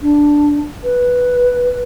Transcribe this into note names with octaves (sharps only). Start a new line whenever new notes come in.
D4
B4